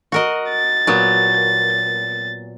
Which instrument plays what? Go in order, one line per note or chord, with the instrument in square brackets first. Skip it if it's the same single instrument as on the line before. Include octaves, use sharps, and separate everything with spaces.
[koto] F#4 A#4 D#5
[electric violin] A6
[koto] A#2 F#3 B3